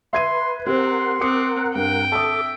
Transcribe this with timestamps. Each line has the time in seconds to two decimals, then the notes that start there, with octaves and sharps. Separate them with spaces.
0.13 B4 E5 C6 G#6 D#7
0.67 C4 G4 A#4 C5 F#5 C6
1.21 C4 D6 D#6 C#7
1.76 G2 G5
2.12 A4 E5 A5 D6 D#6